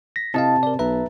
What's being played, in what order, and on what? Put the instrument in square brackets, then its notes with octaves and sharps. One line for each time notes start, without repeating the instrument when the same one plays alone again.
[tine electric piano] A#6 B6
[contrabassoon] C3 [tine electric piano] E4 D#5 F5 [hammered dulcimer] A5
[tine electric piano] A#4 D5
[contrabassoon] B1 [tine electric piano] B4 E5 A#5